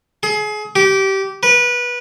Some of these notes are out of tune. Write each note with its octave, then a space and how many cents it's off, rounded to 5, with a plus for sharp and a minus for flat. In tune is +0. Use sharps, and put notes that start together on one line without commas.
G#4 +30
G4 -20
B4 -20